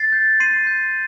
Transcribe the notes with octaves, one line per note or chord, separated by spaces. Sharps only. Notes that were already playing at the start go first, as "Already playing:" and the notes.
Already playing: A6 C7
G6
C6 C7 D#7
G6